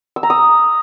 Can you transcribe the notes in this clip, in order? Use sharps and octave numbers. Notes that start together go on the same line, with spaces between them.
E6
A#5
D#6